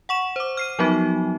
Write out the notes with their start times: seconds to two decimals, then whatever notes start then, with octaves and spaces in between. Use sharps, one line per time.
0.09 F#5 C#6 E7
0.36 C5 D6
0.57 F6 C7 D#7
0.79 F3 F#3 B3 D#4 F#4